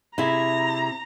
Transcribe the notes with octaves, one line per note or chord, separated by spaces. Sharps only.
C3 E4 G#4 A#5